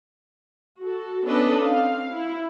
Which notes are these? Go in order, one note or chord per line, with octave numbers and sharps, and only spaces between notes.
F#4 A4
B3 C#4 D4 A4 B4 D#5
C4 F5
E4